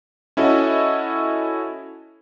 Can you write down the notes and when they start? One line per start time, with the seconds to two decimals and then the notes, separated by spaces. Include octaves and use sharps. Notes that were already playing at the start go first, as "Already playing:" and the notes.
0.37 C#4 E4 F#4 A4 D#5